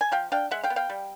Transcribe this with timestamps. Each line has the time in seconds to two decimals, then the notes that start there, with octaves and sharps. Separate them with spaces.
0.01 G#5
0.12 F3 F5 G5
0.32 D4 F5 G5
0.51 G#3 E5 F#5
0.63 F5 G5
0.70 B3
0.76 F5 G5
0.90 G3